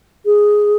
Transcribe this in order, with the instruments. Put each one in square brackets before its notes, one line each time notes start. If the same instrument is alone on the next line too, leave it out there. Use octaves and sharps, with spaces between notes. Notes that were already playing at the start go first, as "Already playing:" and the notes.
[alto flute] G#4